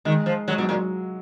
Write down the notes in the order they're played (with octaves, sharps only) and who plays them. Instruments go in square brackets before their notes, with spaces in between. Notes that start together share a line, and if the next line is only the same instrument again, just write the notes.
[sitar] D#3 [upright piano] G#3
[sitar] F3
[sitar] F#3 [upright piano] G#3
[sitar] B2 [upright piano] F#3
[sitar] A#2 [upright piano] F#3